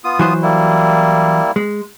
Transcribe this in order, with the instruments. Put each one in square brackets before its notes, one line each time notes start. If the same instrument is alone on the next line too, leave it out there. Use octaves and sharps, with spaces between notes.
[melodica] B3 F4 D#6
[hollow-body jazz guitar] E3 F#3 C5
[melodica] G3 A#3 E4
[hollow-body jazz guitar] G#3